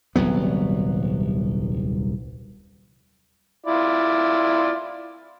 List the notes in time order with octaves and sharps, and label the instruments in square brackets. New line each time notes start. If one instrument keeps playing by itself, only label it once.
[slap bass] D#1 C2 F#3 B3
[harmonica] E4 F4 D5